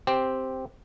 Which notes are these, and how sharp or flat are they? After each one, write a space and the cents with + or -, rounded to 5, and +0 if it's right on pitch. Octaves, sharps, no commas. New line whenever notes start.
C4 +0 G4 +0